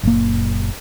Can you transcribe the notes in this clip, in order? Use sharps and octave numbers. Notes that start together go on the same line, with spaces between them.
F#1 A#2 A#3